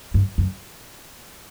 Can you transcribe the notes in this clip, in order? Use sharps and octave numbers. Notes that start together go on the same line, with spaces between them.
G2
F#2